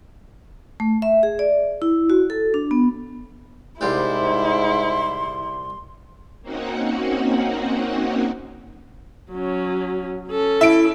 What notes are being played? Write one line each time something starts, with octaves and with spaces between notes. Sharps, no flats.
A3
E5
G#4
D5
E4
F#4
A4
D4
B3
C2 G#2 G3 E4 C6
A#3 C4 C#4 D#4 F#4 F#5
F#3 C#4
C#4 A4
E4 E5 D7